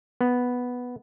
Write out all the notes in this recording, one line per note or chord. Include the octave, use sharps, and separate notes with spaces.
B3